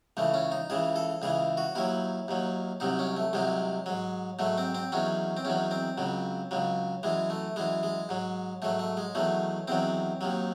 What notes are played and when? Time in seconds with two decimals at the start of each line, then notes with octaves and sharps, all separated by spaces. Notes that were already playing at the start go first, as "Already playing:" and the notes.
0.17 C#2 C#3 E3 A3
0.34 C#4
0.52 D#4
0.70 C#2 C#3 E3 G#4
0.96 A4
1.22 C#2 C#3 E3 G#4
1.57 F#4
1.75 D#2 D#3 F#3 E4
2.28 D#2 D#3 F#3
2.80 C2 C3 D#3 F#3 D#4
2.99 C#4
3.17 A3
3.33 C2 C3 D#3 F#3 G#3
3.86 G#2 F#3
4.39 G#2 F#3 A3
4.58 C4
4.75 C4
4.92 E2 D#3 F#3 C#4
5.37 C4
5.45 E2 D#3 F#3 C#4
5.71 C4
5.98 C#2 C#3 F#3
6.51 C#2 C#3 F#3
7.03 F#2 E3 G#3
7.30 A3
7.56 F#2 E3 G#3
7.83 G#3
8.09 G#2 F#3
8.62 G#2 F#3 A3
8.79 A3
8.97 G#3
9.15 E2 D#3 F#3 A3
9.68 E2 D#3 F#3 C4
10.21 D#2 D#3 F#3